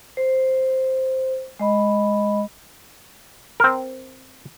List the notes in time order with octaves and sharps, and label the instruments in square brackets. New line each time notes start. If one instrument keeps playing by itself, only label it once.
[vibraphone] C5
G#3 D#5 B5
[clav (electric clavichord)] C4 A#4